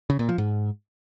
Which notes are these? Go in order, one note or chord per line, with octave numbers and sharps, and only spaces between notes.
C#3
A#2
F3
G#2